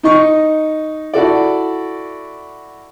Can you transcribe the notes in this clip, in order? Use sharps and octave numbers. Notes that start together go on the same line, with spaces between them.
D#4 D#5 C#6
E4 F#4 A4 D5